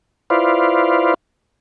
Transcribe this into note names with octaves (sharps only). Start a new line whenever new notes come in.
E4 F4 B4 C5 D5 F5